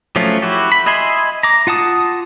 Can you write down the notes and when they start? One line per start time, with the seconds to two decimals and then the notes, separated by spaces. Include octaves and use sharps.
0.16 F3 F#3 A3 C#4 F4
0.42 E4 F#4 G4
0.72 B5
0.86 D#5 E5 G#5 B5 C6
1.43 A#5 D6
1.67 F4 F#5 A5 D#6